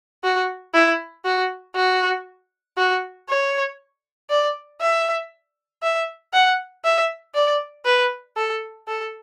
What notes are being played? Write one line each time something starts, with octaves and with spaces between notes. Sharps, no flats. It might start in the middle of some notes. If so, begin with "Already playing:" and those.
F#4
E4
F#4
F#4
F#4
C#5
D5
E5
E5
F#5
E5
D5
B4
A4
A4